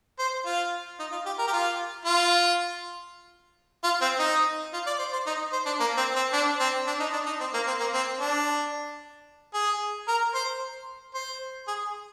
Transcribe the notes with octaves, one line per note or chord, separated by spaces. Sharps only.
C5
F4
D#4
F4
G4
A#4
G4
F4
F4
F4
C4
D#4
F4
D5
C5
C5
D#4
C5
D4
A#3
C4
C4
D4
C4
D4
D#4
D4
D#4
C4
A#3
C4
A#3
C4
D4
G#4
A#4
C5
C5
G#4